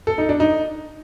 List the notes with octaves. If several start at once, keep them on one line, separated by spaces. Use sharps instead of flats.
A4
D#4
D4
D#4